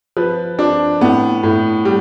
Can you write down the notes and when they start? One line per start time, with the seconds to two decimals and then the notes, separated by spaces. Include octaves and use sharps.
0.17 F3 B4
0.59 F3 D4
1.01 A2 B3
1.43 A2
1.85 G3